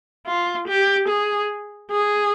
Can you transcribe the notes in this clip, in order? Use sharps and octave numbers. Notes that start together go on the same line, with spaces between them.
F4
G4
G#4
G#4